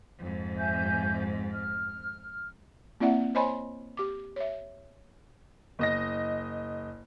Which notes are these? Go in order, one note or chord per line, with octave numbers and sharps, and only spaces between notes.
F2 G#2
E5 G#5 G6
F6
A#3 C4 E4 D5 E5 F#5
C5 C#5 D#5 G#5 B5 C6
G4 D6
C#5 E5
F#1 D#5 A#6